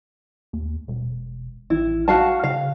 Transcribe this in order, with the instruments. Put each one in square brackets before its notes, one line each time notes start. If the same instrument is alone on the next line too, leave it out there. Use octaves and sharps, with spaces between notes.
[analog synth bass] D#2
E1
[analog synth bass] A1 [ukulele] E4
[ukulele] F#4 F5 A5
[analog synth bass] C#3 [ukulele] F5